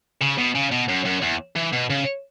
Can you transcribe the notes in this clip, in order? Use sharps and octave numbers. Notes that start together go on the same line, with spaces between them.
C#3
B2
C#3
B2
F#2
F#2
E2
E3
B2
C#3